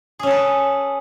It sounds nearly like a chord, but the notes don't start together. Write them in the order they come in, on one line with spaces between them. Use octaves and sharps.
G#4 C#4 A4 B4